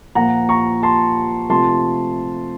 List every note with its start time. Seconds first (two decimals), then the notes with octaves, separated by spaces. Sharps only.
0.15 A#2 F3 A#3 F#5 A#5
0.49 A#5 C#6
0.83 A5 C6
1.49 C3 F3 A3 A5 C6